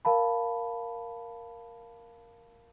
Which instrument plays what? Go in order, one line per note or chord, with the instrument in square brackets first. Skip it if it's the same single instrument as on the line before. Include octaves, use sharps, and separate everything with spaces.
[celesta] A#4 F5 A5 B5